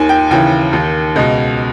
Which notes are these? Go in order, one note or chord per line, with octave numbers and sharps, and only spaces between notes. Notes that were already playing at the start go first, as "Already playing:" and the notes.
Already playing: D#2 D#3 G#5
G5
D#2 C#3 E3 G5
D#2 D#3
C#2 B2 D#5